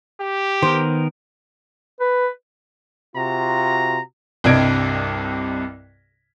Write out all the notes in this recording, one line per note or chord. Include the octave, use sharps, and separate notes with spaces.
G4
D#3 B3 A#4 C5
B4
C3 F4 F#4 A#5
C2 G2 C3 D#5 G#6 D7